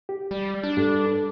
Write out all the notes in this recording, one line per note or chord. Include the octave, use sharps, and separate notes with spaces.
G4
G3 D5
D4
G2 G3 A4